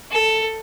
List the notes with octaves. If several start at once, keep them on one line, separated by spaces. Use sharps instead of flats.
A4